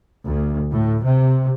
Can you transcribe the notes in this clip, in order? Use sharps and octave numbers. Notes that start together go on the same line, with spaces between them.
D2
A2
C3